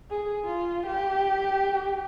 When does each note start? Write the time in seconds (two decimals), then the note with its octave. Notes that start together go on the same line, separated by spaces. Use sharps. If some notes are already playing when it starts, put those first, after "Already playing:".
0.10 G#4
0.45 F4
0.87 G4